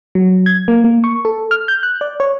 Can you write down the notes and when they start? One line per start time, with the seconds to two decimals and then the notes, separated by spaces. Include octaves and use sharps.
0.15 F#3
0.46 G#6
0.68 A#3
0.84 A#3
1.04 C#6
1.25 A4
1.51 F6
1.68 G6
1.83 F#6
2.01 D5
2.20 C#5